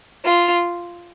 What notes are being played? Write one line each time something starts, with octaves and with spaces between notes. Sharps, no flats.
F4